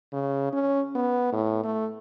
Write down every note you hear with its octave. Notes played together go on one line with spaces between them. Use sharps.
C#3
C#4
B3
A2
A3